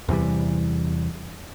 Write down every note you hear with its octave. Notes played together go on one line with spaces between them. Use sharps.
E2 C3 E3 G3